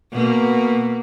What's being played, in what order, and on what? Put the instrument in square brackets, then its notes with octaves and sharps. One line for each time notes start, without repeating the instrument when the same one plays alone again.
[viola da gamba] B2 A#3